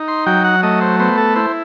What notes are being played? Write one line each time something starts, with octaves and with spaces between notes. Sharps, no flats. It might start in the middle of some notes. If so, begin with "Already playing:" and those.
Already playing: D#4
C6
F#3 G5
F#5
A3 D#5
C5
B3 C5
A4
E4 C5